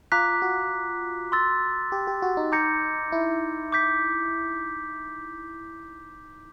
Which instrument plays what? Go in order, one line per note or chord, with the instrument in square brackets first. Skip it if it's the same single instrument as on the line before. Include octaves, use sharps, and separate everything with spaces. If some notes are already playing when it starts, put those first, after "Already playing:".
[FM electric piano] F4 [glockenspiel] A#5 D6 F#6 B6
[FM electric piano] F#4
[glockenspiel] C6 E6 A6
[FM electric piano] G4
G4
F#4
D#4
[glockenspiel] A#5 D6 G6 A#6 C#7
[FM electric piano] E4
[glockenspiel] D6 G6 B6